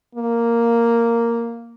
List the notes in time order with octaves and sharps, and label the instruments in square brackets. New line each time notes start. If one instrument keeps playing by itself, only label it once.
[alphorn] A#3